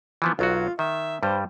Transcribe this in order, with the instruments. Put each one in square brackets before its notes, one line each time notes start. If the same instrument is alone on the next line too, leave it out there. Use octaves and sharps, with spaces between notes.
[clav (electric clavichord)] E3 F3 B3
[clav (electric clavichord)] B1 F#3 F#4 [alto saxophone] F4
[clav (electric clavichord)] D#3 [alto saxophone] E5
[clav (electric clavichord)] G2 G3 [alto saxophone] C5